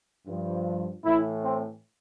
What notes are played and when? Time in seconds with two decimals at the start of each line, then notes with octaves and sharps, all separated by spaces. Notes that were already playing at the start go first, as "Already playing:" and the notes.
0.26 G2 F3
1.04 A2 E3 E4
1.43 C4